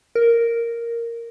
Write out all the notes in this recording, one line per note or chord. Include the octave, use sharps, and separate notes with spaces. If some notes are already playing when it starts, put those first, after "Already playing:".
A#4